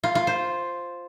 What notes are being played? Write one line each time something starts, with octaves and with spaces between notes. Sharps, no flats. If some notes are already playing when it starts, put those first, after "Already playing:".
F4
F4
C5